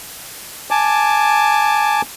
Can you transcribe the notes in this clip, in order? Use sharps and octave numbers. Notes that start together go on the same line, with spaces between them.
G#5 A5 D6